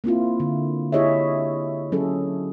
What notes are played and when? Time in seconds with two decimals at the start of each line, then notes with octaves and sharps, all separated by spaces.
0.04 A#3 C4 E4 F4
0.40 D3
0.92 E4 G4 G#4 C#5 D#5 E5
1.92 F#3 C#4 G#4 A4 C#5